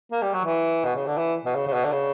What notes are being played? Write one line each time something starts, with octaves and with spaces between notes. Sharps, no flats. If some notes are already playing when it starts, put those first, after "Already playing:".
A#3
G3
F#3
E3
B2
C#3
D3
E3
B2
C#3
C#3
B2
D3
C#3